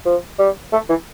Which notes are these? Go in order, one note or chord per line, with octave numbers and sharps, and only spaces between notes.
F3
G3
A3
E3